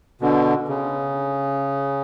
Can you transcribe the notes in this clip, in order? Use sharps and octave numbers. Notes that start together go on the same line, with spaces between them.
B2 D3
C#3